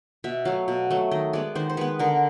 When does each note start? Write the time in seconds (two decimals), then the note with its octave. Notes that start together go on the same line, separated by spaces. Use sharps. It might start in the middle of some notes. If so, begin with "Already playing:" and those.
0.24 B2 E5
0.45 F#3 A3 F5
0.68 B2
0.91 F#3 A3
1.11 D#3 D#5
1.33 G#3 B3 D5
1.55 D#3 C5
1.70 C5
1.77 G#3 B3 B4
1.99 D3 A#4